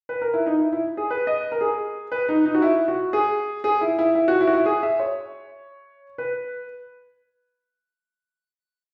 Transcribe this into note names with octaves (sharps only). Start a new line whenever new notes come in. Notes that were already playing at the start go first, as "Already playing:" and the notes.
B4
A#4
E4
D#4
E4
E4
G#4
B4
D#5
A#4
G#4
B4
D#4
D#4
F#4
E4
F#4
G#4
G#4
E4
E4
E4
F#4
E4
F#4
E4
G#4
E5
C#5
B4